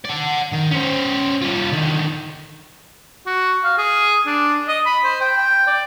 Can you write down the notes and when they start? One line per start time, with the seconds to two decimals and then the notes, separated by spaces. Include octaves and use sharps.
0.05 D5 F#5
0.52 D#3
0.71 C#4 C5
1.42 G3 F4
1.72 D3 D#3
3.26 F#4
3.64 F5
3.78 G#4
4.26 D4
4.68 D#5
4.86 B5
5.04 C5
5.21 G5
5.38 G5
5.67 D5